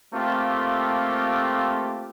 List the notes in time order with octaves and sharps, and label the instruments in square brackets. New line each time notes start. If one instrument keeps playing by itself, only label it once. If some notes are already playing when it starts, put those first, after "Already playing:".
[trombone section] A3 A#3 C4 F4 G4 A4